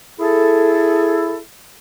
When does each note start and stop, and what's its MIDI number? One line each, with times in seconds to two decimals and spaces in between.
0.20 1.39 64
0.20 1.39 68
0.20 1.39 69